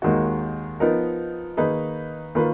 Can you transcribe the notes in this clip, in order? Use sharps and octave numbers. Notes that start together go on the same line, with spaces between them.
D#2 D#3 G#3 D#4 F#4
F3 B3 D#4 A#4
D#3 A#3 D#4 G#4 B4
D#3 A#3 F4 B4